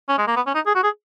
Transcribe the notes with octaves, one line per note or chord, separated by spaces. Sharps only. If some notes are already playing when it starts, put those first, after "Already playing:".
C#4
G#3
A#3
B3
C#4
D#4
G#4
F#4
G#4